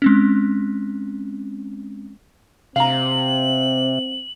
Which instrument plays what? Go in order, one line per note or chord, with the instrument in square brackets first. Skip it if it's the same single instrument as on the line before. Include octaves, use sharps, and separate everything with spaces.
[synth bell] G#3 C4 C#4
[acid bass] C3 [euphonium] C4 [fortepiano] F5 A#5 [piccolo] F#7